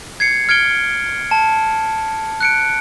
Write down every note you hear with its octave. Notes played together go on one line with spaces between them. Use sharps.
G#6 C7 C#7
F6 G#6 C#7 D7 G7
A5
F#6 C#7 D7